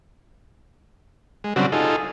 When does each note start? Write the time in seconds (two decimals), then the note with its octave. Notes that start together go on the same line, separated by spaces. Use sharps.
1.44 G#3
1.56 C#3 F#3 G3 C4 D4 F#4
1.72 D#4 F4 G#4 A4